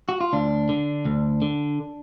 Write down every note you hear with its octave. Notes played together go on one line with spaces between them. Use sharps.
F#4
F4
D2 D4
D3
D2
D3